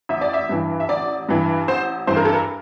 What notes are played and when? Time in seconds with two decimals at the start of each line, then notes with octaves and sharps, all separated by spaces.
0.09 A1 E5
0.21 D5
0.33 E5
0.49 G2 E3
0.80 E5
0.89 A1 D5
1.29 G2 E3
1.68 A1 C5
2.07 G2 E3 C5
2.16 A#4
2.25 A4
2.34 A#4